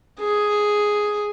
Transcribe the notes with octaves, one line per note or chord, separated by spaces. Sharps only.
G#4